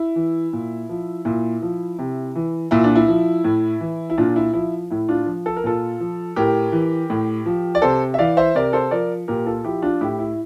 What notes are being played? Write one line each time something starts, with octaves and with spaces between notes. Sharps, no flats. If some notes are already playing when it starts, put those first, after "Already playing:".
Already playing: E4
E3
A#2
F3
A#2 E4
F3
C3
E3
A#2 E4
D4
E4
F3
A2
E3
E4
A#2 D4 F4
E4
F3 E4
A2 E4
D4 F4
F3
A4
A#4
A#2 F4 A4
F3
A2 G4 A#4
E3
A2
F3
D5
C3 A4 C5
E5
E3 D5 F5
C5 E5
C3 A#4 D5
A4 C5
F3 A#4 D5
A#2 G4 A#4
F4 A4
F3 E4 G4
D4 F4
A2 E4 G4
E4